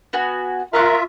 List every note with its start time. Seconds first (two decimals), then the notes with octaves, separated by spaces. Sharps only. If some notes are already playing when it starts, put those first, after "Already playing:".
0.13 B3 F#4 G#5
0.73 F4 A#4 E5 F5 C#6 F#6